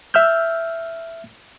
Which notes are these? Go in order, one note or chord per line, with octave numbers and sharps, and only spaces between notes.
E5 E6 F6 G6